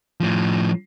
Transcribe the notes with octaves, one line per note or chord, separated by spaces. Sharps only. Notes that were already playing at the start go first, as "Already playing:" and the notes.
A2 F3